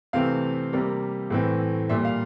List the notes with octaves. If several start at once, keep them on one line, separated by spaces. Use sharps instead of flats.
C3 E3 A3 C4 F5
C3 G3 A#3
A2 E3 A3 C4
A#2 G3 A#3 E5
F5